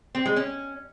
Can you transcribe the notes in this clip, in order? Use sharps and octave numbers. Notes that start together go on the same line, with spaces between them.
C4
G#3
C#4